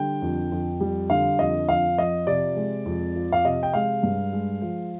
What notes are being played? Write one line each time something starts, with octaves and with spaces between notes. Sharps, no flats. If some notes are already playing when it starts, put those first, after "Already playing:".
Already playing: D3 G3 G5
F2
F2
G3
D3 F5
F2 D#5
F2 F5
F3 D#5
C3 D5
G#3
F2
F3
F5
C3 D#5
G5
G#3 F5
G2
G#3
F3